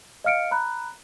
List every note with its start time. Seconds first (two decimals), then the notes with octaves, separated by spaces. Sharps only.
0.24 D#5 F5 F6 C#7 D7
0.51 A#5 B5 F#6